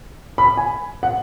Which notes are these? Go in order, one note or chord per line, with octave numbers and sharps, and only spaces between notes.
B5
G#5
F#5